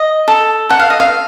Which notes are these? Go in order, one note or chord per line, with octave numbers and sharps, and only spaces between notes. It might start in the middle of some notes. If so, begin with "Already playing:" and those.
Already playing: D#5
A4
A4 F#5
F5
D#5
F5